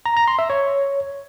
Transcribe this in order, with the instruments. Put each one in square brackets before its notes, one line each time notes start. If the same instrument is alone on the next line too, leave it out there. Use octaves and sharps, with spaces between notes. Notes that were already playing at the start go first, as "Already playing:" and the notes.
[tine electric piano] A#5
A#5
C6
E5
C#5